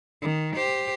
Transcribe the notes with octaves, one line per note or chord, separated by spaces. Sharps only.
D#3
G4 C5